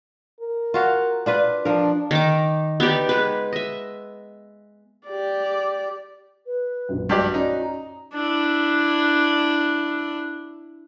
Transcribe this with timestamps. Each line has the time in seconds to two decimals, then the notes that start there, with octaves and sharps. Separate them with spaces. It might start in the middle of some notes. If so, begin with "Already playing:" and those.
0.41 A#4
0.74 F4 F#4 F5
1.26 D4 F4 B4
1.65 F3 D4 A#4
2.11 D#3 D#4 D6
2.80 B3 D#4 G4 D5
3.09 G#3 B4
3.53 D#5 E5
5.07 G4 D5
6.46 B4
6.89 A#1 F#2
7.09 G2 F#4 G4 D5
7.34 C#4 D#4 D5
7.64 A#5
8.14 D4 E4